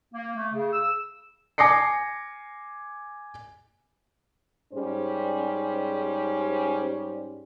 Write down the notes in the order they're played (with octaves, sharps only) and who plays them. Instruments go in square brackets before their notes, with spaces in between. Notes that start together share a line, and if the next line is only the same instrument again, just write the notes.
[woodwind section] A#3
A3
C#3
E6
[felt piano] G#5 D6 A#6 C7 C#7
[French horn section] G#2 G3 C#4 C5